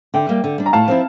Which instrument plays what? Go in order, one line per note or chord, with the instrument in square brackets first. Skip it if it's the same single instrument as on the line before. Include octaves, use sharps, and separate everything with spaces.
[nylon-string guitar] D3 [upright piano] E5 G5
[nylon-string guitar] G3 A#3
D3
G3 D4
[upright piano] A#5
[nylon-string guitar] A2 [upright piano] F5 A5
[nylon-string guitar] F3 C4 E4